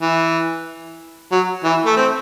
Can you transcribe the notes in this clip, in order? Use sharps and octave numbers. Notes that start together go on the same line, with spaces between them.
E3
F#3
E3
A3
C4